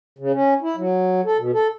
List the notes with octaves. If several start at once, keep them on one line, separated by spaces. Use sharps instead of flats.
C#3
C#4
E4
F#3
A4
B2
A4